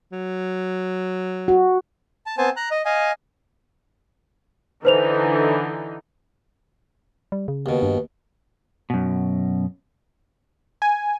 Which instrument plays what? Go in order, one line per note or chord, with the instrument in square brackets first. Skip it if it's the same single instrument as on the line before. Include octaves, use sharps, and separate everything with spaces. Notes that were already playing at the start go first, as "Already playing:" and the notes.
[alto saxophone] F#3
[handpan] F#4
[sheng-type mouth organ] A5
B3 C4 C5 G#5 A5
A#5 F#6
D#5
D#5 F5 G#5
[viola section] D3 E3 D#4 [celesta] B4 C5 F7
[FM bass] G3
C#3
[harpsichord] D#2 B2
[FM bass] G2
[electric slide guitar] F#2 B2
[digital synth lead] G#5